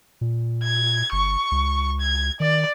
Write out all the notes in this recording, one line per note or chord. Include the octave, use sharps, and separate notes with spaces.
A#2
G#6
G1 C#6
C#2
G#6
D#3 D5